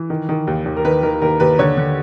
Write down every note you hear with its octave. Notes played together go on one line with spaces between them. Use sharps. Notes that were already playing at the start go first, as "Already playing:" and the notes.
Already playing: E3
D#3
D#3
D#2
D#2
A#4
D#3 B4
D#3 A#4
D#2 A#4
D#2 B4
D3 C#5
D3